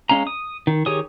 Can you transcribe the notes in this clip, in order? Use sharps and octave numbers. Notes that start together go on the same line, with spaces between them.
G#3 C#4 F5 A#5
D#6
D#3
D#3 G4 G#4 C#5 D#6